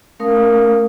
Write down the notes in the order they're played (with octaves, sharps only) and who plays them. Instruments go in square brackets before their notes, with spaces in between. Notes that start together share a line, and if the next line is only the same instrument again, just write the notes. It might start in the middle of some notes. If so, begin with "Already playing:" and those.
[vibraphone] A3 C#4 A#4 F5 D#6